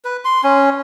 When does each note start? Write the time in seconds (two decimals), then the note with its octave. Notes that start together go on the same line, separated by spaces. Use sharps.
0.04 B4
0.25 C6
0.43 C#4